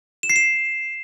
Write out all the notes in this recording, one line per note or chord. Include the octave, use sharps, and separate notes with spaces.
E7
C7
E7